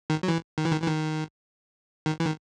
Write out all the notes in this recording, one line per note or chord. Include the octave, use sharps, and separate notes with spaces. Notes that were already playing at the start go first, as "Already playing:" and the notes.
D#3
F#3
E3
D#3
E3
D#3
E3
D#3
D#3
E3
D#3